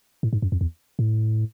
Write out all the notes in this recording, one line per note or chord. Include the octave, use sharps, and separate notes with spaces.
A2
G#2
F#2
F2
E2
A2